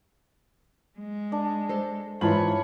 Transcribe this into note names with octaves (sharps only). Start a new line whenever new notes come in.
G#3
D4
A4 C5
G#2 E3 E4 F4 C#5 A5 B5 F#7